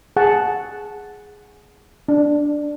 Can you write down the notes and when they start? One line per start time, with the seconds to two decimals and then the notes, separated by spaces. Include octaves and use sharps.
0.16 G#4 F#5 A5
2.08 D4